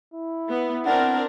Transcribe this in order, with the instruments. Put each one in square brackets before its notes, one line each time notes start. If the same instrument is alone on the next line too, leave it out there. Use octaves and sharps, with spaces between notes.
[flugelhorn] E4
[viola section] B3
[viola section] C4 D4 A#4 [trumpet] F#5